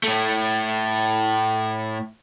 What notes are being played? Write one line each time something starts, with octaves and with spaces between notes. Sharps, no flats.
A2 A3